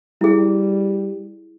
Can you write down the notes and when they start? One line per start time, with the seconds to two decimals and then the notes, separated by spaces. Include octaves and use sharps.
0.21 G3 E4 G#4